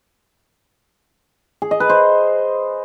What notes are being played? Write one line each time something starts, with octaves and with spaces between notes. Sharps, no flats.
G#4
D#5
B4
C5